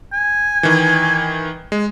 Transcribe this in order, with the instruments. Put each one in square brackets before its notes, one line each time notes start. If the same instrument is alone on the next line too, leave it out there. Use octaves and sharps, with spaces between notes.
[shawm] G#5
[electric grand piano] D#3 E3
G#3